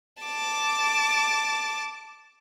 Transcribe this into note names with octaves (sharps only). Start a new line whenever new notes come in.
A5 D6